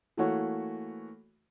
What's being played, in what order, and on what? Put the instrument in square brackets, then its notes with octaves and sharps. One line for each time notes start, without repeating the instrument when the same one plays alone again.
[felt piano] E3 A3 A#3 F#4 C#5